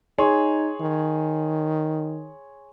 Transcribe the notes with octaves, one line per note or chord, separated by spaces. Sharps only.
D#4 G#4 C#5 C6
D#3